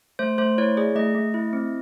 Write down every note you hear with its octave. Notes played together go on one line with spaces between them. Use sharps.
A3 C5
A3 C5
E4 C#5
G#4 D5
A3 D#5
A3
E4
C4